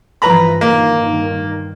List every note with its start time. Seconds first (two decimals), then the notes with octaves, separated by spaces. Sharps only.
0.22 G2 E3 F3 B4 A#5 B5
0.61 G2 A#2 D#3 A#3